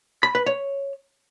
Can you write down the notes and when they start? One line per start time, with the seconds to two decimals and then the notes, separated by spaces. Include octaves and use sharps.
0.23 B5
0.35 B4
0.46 C#5